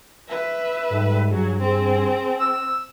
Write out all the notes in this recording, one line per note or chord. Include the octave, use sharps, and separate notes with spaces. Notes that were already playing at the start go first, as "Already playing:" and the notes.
B4 E5
G#2 G3 A4
G2 F#3 G#4
C4 G#4
E6